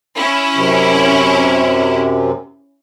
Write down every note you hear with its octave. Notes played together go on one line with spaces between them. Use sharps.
C#4 E4
F#2 C3